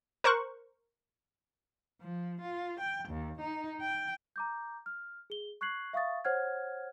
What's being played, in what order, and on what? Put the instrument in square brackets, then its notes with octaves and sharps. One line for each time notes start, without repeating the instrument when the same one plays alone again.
[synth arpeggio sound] A#4 C5 C#6 F#6
[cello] F3
F4
G5
D#2
D#4
G5
[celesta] A#5 D6 G6
F6
G#4 G7
C#6 F#6 G#6 C7 F#7
E5 F5 C#6 D#6 A6
C5 C#5 F#5 F6 G#6